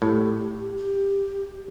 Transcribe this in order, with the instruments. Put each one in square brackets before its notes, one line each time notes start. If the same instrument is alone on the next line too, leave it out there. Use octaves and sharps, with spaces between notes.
[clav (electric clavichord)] A2 [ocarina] G4
[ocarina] G4